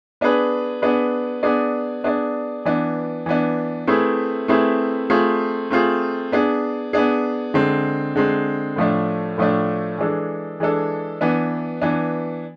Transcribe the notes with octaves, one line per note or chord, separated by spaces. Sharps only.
B3 D4 G#4 B4
B3 D4 G#4 B4
B3 D4 G#4 D5
B3 D4 G#4 D5
E3 B3 D4
E3 B3 D4
A3 C4 E4 G#4 B4
A3 C4 E4 G#4 B4
A3 C4 F4 G#4
A3 C4 F4 G#4
B3 D4 G#4
B3 D4 G#4
D3 G#3 C4
D3 G#3 C4
A2 F3 A3 D4
A2 F3 A3 D4
E3 G#3 D4 A4
E3 G#3 D4 A4
E3 B3 D4
E3 B3 D4